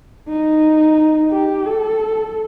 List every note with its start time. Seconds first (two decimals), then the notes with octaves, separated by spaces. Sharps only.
0.29 D#4
1.31 G4
1.66 A4